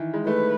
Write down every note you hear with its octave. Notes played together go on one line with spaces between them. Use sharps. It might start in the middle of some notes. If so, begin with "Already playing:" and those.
Already playing: D#3 E3
G#3
A3 B4